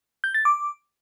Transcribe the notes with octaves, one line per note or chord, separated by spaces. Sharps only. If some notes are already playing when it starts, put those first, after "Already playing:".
G6
A6
D6